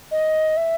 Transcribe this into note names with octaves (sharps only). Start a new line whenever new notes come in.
D#5
E5